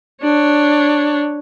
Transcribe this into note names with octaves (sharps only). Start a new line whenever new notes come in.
D4 C#5